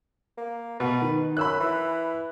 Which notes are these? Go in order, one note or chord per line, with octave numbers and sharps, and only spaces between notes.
A#3
B2 B4
D#3
F#2 B5 E6 F#6
E3